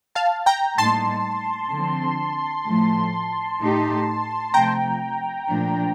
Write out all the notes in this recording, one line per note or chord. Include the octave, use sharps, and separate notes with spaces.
F5 A5
G5 A#5
A2 G3 A#3 D#4 A5 C6
D3 F3 C4
A2 F3 A3
A2 A3 D#4 G4
C3 F3 A3 G5 A#5
A#2 F3 A3 D4